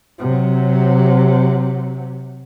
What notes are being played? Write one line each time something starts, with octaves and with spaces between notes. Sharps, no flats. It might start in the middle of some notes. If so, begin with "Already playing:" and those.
C3 F#3